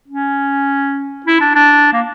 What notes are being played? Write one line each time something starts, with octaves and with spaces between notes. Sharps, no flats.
C#4
E4
D4
D4
A#3